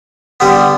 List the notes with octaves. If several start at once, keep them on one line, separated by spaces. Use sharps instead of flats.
D3 G3 B3